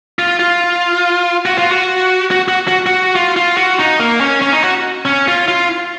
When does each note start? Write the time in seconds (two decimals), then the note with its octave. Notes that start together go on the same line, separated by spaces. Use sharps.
0.19 F4
0.39 F4
1.46 F#4
1.58 F4
1.72 F#4
2.31 F#4
2.48 F#4
2.68 F#4
2.86 F#4
3.15 F4
3.36 F4
3.57 F#4
3.79 D#4
3.99 A#3
4.21 C#4
4.42 C#4
4.53 D#4
4.64 F#4
5.05 C#4
5.28 F4
5.48 F4